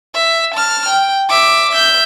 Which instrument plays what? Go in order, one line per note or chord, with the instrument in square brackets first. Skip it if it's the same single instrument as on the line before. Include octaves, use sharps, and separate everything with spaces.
[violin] E5
A5 F6
G5
E5 D6
E5 G6